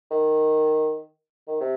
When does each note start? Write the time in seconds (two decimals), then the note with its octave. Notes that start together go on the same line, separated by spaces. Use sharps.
0.11 D#3
1.48 D#3
1.61 C3